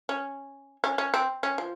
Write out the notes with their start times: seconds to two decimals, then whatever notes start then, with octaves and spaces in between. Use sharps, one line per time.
0.09 C#4
0.84 C#4
0.98 C#4
1.14 C4
1.43 C#4
1.58 F3